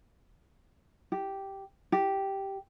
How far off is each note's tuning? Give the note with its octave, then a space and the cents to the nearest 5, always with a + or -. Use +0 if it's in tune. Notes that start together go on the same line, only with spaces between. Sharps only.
G4 -5
G4 -5